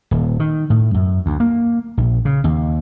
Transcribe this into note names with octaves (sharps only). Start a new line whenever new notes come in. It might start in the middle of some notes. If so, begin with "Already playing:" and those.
D#1
D#3
A2
F#2
D2
A#3
A#1
C#3
D#2